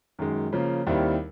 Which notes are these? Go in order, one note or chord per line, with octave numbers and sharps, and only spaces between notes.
F#2 D#3 G#3
C#3 F3 A#3
D#2 D#3 G3 C4 E4